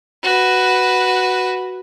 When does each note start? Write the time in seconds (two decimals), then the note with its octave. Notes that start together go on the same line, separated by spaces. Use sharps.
0.24 F#4 B4